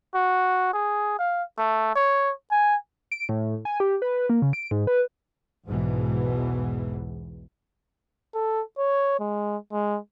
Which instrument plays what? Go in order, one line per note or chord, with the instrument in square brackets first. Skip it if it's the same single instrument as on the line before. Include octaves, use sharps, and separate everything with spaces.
[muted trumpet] F#4
G#4
F5
A3
C#5
G#5
[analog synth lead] D7
A2
G#5
G4
B4
A#3
C#3
D7
G#2
B4
[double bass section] B1 E2 G#2 B2 E3 G#3
[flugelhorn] A4
C#5
G#3
G#3